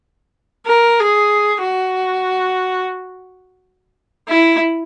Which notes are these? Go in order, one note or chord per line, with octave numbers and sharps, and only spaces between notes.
A#4
G#4
F#4
E4